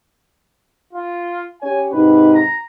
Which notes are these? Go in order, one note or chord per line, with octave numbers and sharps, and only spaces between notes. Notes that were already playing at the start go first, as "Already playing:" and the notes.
F4
C#4 G4 C#5 G#5
G#2 C3 D#4 B4
A#5